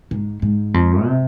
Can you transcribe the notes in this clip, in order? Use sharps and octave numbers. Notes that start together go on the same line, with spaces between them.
G#2
G#2
F2
C3